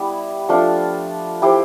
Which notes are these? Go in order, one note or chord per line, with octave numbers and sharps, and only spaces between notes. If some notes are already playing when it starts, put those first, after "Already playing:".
Already playing: G3 B3 E4 G4
F3 A3 D4 F4
E4 G4 C5